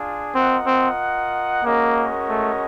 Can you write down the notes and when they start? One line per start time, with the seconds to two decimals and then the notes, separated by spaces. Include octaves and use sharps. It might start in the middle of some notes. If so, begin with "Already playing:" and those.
Already playing: D4 F4 G#4
0.34 C4 F4 A#4 D#5 F#5
0.66 C4
1.64 G#3 A#3 C#4 F#4 A#4 D#5
2.29 A3